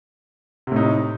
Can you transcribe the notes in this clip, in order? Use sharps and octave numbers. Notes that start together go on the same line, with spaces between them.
A2 C3 D#4